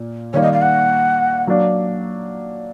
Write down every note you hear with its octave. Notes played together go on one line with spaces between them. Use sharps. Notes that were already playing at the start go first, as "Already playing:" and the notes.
Already playing: A#2 A#3
D#3 G3 A#3 C#5
D#5
F5
F#5
F#3 A#3 D4